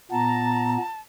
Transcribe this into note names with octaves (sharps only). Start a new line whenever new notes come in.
A#2 B3 A5 A#5